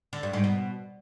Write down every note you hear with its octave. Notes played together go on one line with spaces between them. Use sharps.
D3
G2
G#2
B2